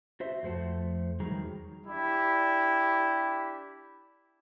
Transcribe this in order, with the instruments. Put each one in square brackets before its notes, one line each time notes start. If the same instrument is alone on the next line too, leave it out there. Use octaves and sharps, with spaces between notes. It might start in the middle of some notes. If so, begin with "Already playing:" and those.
[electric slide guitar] F#4 C5 E5
F2 F3 A3 C5 F#5 A5
E2 D#3 F#3 G3 G#4 A#5
[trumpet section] D4 E4 G4